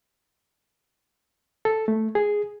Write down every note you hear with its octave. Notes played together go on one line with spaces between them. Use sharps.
A4
A3
G#4